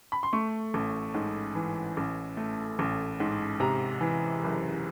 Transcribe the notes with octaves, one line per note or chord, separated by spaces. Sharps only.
B5
C6
A3 C#6
A1
G#2
E3
A1
A3
A1
G#2
C3 A#5
E3
F#1